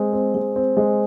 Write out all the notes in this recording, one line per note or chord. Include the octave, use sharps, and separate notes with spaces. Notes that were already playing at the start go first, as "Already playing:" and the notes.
Already playing: G#3 C4
C4
G#3
C4
G#3